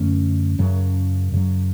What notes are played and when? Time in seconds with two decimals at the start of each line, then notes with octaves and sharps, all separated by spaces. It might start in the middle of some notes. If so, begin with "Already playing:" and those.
Already playing: F#2 D3 A3 C#4
0.59 F#2 C#3 F#3
1.32 F#2 C#3 F#3